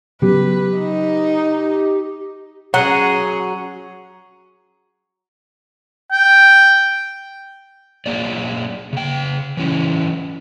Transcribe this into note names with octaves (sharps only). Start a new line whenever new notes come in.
C#3 F#3 B3 G4 B4
D#4
F#3 C#4 G#4 F#5 A#5
G5
F#3 A#3 G#4 D5
C#3 G5
E3 F#3 C#4 E4